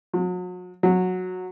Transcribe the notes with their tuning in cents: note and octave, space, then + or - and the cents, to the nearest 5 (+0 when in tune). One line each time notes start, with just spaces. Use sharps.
F#3 -40
F#3 -10